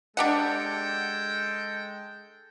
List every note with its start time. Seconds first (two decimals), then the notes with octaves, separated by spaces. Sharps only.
0.17 G#3 D4 G4 A4 F#5 G5